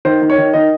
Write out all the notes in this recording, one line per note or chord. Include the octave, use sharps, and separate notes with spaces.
D#3 C5
D#3
C#5
D#3
D#3 D#5